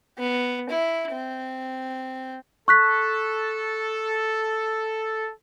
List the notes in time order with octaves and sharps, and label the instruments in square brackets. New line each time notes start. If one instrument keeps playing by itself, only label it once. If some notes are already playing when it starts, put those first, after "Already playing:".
[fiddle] B3
E4
C4
[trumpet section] A4 [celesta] C#6 F#6 B6